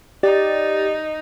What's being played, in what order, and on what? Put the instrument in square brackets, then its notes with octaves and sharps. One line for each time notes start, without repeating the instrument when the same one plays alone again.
[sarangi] D#4 [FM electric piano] G4 D5 A6